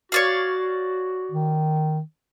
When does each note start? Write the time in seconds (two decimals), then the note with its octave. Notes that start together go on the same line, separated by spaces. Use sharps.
0.12 F#4 C#5 D5 F5
1.32 D#3